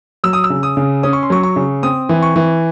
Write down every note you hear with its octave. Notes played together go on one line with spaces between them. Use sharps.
F#3 E6
D#6
E6
C#3
D#6
C#3
C#4 D#6
C#6
C6
F#3 C#6
C#6
C#3
C4 D#6
E3
C#6
E3